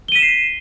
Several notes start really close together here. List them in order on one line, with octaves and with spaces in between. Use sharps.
G7 D#7 B6 E7 C7